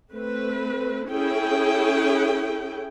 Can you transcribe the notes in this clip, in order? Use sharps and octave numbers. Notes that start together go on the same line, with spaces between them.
A3 C4 B4
C#4 E4 G#4 A4 G5